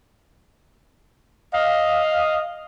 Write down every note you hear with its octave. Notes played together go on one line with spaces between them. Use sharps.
D#5 F5